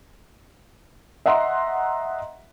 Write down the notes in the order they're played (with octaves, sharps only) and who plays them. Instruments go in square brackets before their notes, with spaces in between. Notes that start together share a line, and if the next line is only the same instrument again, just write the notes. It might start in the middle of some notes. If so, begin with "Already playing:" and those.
[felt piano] D#5 E5 F#5 A#5 C6